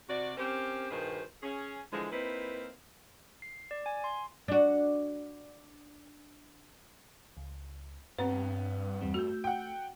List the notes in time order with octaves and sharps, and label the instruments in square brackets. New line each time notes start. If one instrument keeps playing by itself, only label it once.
[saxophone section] C3 F#4 D5
C4 C#4 G4 A#4 C5
G2 B2 D#3 G#4 B4 C5
C#4 G#4
D3 E3 F3 G#3
A#3 C4 D#4 E4 B4
[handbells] C7
D5
G#5
C6
[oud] D4 F#4
[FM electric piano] C#2
[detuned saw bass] G2 [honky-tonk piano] B3 [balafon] C4 B4 [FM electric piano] C#5
[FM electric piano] E2 G3 C4
[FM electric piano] A3 E6 G6 [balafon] F#4
[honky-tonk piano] F#5 G5